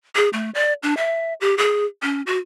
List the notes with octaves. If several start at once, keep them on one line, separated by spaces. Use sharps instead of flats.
G#4
A3
D5
D4
E5
G4
G#4
C#4
F#4